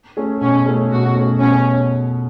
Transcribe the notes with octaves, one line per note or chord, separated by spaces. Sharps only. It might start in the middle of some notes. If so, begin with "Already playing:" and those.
A3 C#4 G#4
B2 C#4
A3 C#4 G#4
B2 F#4
A3 C#4 G#4
B2 C#4